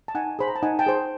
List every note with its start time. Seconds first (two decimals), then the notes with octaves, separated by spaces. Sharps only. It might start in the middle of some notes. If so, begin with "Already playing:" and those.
0.08 A5
0.15 D#4 F#5 G#5
0.39 G#4 C5 B5
0.48 A#5
0.56 A5
0.63 D#4 F#5 G#5
0.79 G5 A5
0.86 G#4 C5